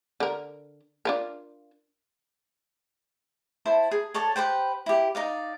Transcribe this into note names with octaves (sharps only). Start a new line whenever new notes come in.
D3 A#4
D4 F4 A#4
E4 C5 A5
G#4
A4 C#5 D5 A5
G4 B4 C5 G5
E4 G4
D#4 D5 F5